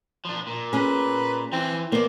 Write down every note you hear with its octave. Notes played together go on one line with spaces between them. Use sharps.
F3 D4
A#2
C#4 G#4 B4
E3 C4
E2 A#3 B3 C5 D5